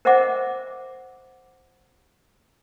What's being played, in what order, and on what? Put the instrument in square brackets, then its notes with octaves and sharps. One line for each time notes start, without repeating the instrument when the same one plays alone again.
[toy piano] A#4 C5 D#5 E5 F#5 D6